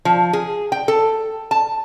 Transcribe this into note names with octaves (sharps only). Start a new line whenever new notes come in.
F3
G#4
G5
A4
A5